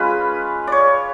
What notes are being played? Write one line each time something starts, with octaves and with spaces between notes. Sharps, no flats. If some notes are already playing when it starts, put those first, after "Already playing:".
Already playing: G#3 C#4 F4 B4
C#5 D5